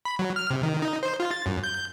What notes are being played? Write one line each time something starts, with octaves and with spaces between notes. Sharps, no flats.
B5
F#3
F6
C3
D#3
D#4
C5
F4
A6
F#2
G6